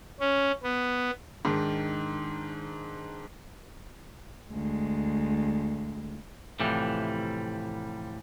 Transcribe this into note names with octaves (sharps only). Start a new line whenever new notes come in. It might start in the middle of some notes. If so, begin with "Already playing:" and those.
C#4
B3
G#2 D#3 D4
D2 G#3
A2 C3 E3 F3 G3